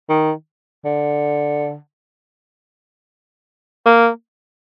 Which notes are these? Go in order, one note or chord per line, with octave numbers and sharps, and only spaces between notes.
D#3
D3
A#3